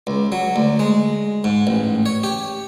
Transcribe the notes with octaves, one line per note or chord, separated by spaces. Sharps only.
C#2
F#3
D2
G#3
G#2
A1
C#5
G4